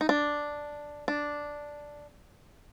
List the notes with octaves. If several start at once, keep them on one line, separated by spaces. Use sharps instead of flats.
D#4
D4
D4